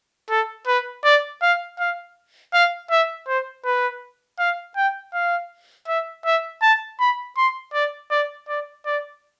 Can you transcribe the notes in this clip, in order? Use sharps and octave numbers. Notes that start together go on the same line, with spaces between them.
A4
B4
D5
F5
F5
F5
E5
C5
B4
F5
G5
F5
E5
E5
A5
B5
C6
D5
D5
D5
D5